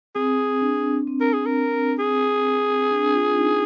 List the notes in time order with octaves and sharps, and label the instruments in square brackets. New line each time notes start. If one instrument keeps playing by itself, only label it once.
[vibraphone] C4 [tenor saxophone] G#4
[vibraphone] D4
C4
[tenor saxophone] A#4
G#4
A#4
G#4
[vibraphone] D4
F4
D#4